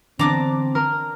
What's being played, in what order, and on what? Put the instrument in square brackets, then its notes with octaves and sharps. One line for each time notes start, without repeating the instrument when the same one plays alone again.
[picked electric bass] D3 E3 B3 [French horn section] C4 [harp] D4 [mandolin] A#5 D6 F#6
[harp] A#4